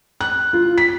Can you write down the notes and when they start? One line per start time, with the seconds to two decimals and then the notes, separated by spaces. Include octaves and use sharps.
0.21 F#6
0.53 F4
0.78 B6